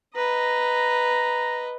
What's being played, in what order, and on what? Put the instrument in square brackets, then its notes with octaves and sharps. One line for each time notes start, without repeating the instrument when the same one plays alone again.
[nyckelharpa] B4 D#5 [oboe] A#5